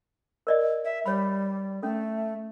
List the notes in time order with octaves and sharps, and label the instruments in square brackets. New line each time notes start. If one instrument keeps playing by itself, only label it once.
[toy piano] A#4 D5 D#5
[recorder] E5
[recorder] G3 [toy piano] C#5 B5
[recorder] A3 [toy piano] C#4 A4